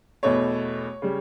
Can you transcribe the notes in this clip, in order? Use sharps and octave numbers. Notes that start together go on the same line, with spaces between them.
E2 B2 A3 C#5
C#3 G3